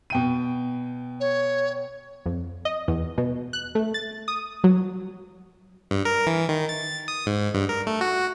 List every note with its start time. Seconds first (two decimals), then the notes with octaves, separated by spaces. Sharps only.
0.10 B2 G5 D#7
1.20 C#5
2.26 F2
2.65 D#5
2.88 E2
3.18 B2
3.53 F#6
3.75 A3
3.94 A6
4.28 D#6
4.64 F#3
5.91 G2
6.05 A#4
6.26 E3
6.49 D#3
6.69 A6
7.08 D#6
7.26 G#2
7.54 G2
7.69 A#4
7.87 A3
8.01 F#4